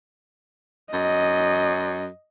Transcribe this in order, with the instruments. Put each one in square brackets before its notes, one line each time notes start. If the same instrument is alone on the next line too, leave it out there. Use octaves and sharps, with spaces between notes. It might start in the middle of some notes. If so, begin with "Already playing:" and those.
[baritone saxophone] F#2 [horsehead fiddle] D#5